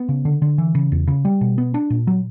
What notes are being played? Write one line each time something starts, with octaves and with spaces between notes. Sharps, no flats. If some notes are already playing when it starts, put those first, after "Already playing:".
Already playing: B3
C#3
D3
D3
E3
C#3
E2
C#3
G3
B2
B3
D4
A#2
F#3